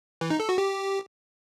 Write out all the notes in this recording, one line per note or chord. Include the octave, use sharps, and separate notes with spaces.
E3
D#4
A4
F#4
G4